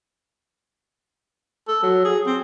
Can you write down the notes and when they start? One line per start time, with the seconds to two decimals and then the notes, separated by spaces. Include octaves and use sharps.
1.68 A4
1.83 F#3
2.05 G#4
2.27 C4